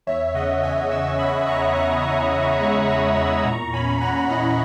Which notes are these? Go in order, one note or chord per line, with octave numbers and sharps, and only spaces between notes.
E2 C#5 E5
C#3 D#5 F#5
E2 E5 G#5
C#3 C#6 E6
E2 B5 D#6
C#3 A#5 C#6
E2 B5 D#6
E2
E2
G#3 C#6 E6
E2 C#6 E6
E2 B5 D#6
A#2 A#5 C#6
C#4 G#5 B5
A#2 F#5 A#5
E4 D#5 F#5